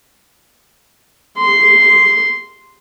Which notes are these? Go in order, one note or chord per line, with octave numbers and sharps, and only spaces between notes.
C6